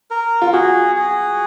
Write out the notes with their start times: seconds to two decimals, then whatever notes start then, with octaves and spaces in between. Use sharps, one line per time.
0.11 A#4
0.42 F4
0.53 F#4 G#4
0.96 G#4